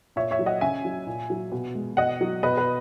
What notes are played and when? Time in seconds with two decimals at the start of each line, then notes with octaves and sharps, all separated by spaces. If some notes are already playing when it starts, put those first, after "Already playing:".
0.16 A#2 C#5 E5
0.31 C#5 E5
0.39 F#3
0.46 D#5 F#5
0.61 C#3 E5 G#5
0.85 F#3
1.07 A#2
1.30 F#3
1.52 B2
1.75 G#3
1.97 B2 D#5 F#5
2.21 F#3
2.43 B2 B4 D#5
2.57 B4